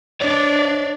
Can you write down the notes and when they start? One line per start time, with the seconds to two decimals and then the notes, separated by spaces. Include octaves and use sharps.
0.21 D4 C#5 D5